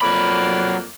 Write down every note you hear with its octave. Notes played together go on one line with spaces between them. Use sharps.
F2 F#3 A#3 D5 B5